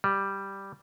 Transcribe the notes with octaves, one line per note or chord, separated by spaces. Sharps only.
G3